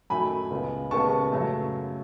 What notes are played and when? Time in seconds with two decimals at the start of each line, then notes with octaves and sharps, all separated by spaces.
0.10 F#2 D#3 F#3 A3 G#5 B5
0.51 C#2 C#3 G#3 B3
0.91 D#2 C#3 G#3 B3 A5 C#6
1.32 F#2 C#3 F#3 A3